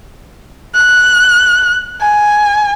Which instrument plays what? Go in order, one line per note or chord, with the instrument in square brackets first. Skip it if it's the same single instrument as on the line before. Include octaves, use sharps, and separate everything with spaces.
[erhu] F#6
G#5